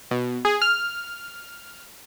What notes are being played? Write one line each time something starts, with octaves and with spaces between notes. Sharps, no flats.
B2
G#4
F6